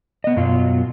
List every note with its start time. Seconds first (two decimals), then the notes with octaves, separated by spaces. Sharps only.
0.24 B3 D#5
0.36 F#2 B2 F#3 F4